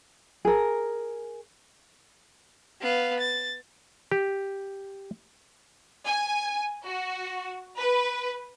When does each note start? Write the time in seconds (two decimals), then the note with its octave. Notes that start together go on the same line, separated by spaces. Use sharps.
0.45 G#4 A#4
2.81 B3 F5
3.20 A6
4.12 G4
6.06 G#5
6.86 F#4
7.78 B4